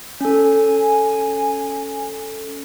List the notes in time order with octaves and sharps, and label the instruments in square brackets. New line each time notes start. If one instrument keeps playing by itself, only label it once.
[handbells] C#4 A4 [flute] G#5